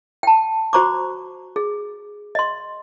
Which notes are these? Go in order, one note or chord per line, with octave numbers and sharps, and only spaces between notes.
G5 A5
F#4 C5 A#5 C#6 D6
G#4
D#5 C6